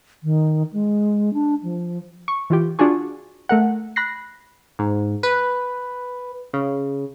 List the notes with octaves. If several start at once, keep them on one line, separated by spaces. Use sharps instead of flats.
D#3
G#3
D4
F3
C#6
E3 F4 G4
D4 F4 F#4 G#4 C#6
A3 A#4 F#5
B5 F#6 A#6 C7
G#2
B4
C#3